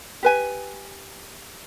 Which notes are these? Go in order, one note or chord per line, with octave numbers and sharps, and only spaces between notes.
G4 B4 G#5